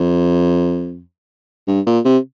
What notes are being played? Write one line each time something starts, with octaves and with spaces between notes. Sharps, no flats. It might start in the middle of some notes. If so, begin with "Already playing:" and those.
Already playing: F2
G2
A#2
C3